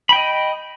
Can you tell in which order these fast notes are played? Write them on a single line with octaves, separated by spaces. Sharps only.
B5 G5 D#5